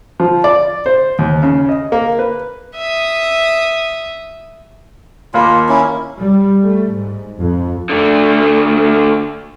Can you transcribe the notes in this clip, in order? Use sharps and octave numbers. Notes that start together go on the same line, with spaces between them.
F3
D5
C5
D#2
C#3
D#5
A#3
B4
E5 D#6
D#2 A#3 F4 B5
C#4 E4
G3
A3
G#2
F2
D3 A3